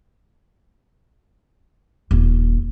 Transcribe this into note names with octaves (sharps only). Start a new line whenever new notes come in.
D#1